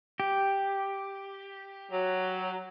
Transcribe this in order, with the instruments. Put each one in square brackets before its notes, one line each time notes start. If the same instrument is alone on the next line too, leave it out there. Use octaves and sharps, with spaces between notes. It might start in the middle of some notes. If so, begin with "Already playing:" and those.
[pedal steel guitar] G4
[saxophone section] F#3